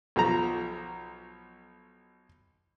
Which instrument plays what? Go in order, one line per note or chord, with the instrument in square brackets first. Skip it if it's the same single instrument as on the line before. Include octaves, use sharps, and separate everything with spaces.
[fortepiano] B1 F3 A#5